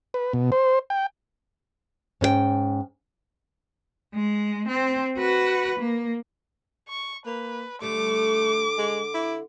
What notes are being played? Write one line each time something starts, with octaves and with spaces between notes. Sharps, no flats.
B4
B2
C5
G5
G#2 C#4 A#4 G5
G#3
C4
F#4 B4
A#3
C#6
A#3 B4
D3 G3 A3 D6
G#3
E4